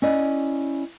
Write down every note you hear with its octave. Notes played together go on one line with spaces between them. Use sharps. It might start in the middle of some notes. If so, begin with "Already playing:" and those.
C#4 E4 D5 D#5